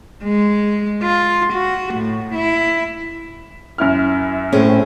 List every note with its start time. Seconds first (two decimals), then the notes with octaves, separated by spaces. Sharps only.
0.24 G#3
1.03 F4
1.53 F#4
1.95 A2
2.35 E4
3.78 F#2 E4 F6
4.52 A2 C4 C#4 G#4